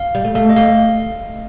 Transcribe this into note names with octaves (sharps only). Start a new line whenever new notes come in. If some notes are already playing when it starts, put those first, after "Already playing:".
Already playing: F5
G3
A3
A3 F5
D#5
A3 F5